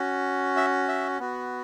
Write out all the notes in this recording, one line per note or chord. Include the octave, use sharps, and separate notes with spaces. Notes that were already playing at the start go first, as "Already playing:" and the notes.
Already playing: C#4 F#4
E5
E5
B3 F#4